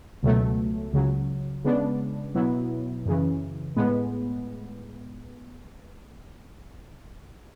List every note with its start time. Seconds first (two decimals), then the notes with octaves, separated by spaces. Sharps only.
0.23 C#2 B2 F#3 A3
0.93 C#2 C#3 F#3
1.65 C#3 G#3 B3 D4
2.35 B2 F#3 B3 E4
3.05 F#2 C#3 E3
3.76 A2 G#3 B3